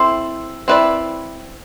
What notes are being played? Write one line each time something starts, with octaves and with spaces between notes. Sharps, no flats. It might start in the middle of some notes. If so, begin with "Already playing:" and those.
Already playing: C4 E4 A4 C5
C4 E4 B4 D5